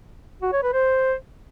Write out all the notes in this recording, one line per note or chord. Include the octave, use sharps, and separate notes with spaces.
F#4
C#5
B4
C5